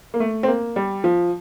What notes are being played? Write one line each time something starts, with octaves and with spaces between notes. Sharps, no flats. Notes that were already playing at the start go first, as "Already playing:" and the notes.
A#3
A3
C4
A#3
G3
F3